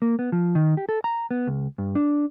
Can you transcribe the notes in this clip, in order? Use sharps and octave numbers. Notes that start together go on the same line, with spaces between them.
A#3
B3
F3
D#3
G4
A4
A#5
B3
C#2
G2
D4